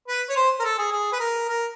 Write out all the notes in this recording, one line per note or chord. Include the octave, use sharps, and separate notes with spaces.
B4
C#5
C5
A#4
A4
G#4
G#4
B4
A#4
A#4